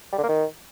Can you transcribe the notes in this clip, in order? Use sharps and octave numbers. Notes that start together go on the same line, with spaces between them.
G3
D3
A#3
D#3